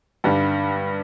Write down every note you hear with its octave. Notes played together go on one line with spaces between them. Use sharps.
G2 D3 G3